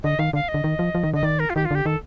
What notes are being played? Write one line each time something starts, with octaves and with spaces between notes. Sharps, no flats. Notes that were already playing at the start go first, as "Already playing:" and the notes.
D3 D#5
D#3 F5
D3 F5
D#5
D3
D#3
F3
F3
D#3
D3 D#5
D#3 D5
A#4
F4
D#3 G4
F4
D3 G4
D#3 A4